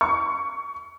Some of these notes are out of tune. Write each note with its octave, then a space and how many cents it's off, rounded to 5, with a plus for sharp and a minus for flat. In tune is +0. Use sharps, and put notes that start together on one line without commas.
C#6 +20